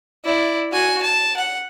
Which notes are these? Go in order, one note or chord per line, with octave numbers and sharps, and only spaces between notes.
E4 D5
F#4 G#5
A5
F#5